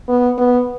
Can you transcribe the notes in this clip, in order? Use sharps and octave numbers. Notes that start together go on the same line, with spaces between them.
B3
B3